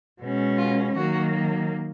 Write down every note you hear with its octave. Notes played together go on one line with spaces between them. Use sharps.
B2 G#3 C#4
F4
D#3 F#3 A#3 F#4